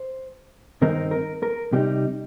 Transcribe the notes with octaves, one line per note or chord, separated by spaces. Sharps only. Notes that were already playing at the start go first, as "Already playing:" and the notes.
Already playing: C5
G2 D#3 C4 D#4 A#4
A#4
A#4
C3 G3 D#4 G4